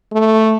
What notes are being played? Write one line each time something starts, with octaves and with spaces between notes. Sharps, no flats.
A3